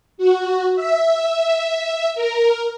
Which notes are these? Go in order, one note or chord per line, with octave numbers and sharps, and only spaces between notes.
F#4
E5
A#4